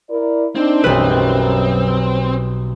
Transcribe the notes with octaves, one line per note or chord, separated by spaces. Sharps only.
E4 A#4 D5
C4 D4 D#4
B1 F#2 G3 B4